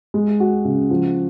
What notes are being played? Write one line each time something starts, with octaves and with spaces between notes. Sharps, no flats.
G#3
F#4
C#3
F3